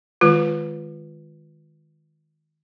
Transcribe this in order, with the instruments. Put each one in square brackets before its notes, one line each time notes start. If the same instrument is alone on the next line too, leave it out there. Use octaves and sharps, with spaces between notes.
[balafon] D#3 G#3 F4 B4